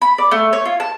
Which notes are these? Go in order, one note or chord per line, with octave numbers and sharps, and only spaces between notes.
B5
D5
A3
C#5
F4
A5